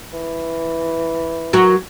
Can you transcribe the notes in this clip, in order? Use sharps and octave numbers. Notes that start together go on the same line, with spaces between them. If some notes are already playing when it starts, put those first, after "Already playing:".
E3
F#3 F#4 A#4